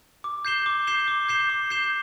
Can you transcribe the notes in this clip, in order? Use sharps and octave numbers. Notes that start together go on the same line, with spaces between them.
D6
G6 C7 E7 G7
D6
G6 C7 E7 G7
D6
G6 C7 E7 G7
D6
G6 C7 E7 G7